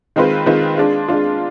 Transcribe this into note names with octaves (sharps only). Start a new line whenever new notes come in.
D#3 G#3 C4 F4 B4
D#3 G#3 C4 F4 B4
G#3 D4 F4
G#3 D4 F4